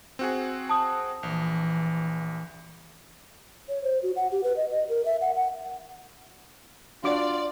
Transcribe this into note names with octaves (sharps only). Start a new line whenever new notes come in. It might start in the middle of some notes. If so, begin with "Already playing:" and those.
C4 F#4 G#4
A5 D#6
A#1 E3
C#5
C5
F#4
F#5
G4
B4
D#5
D#5
A#4
E5
F#5
F#5
D4 F4 F#4 D5 D6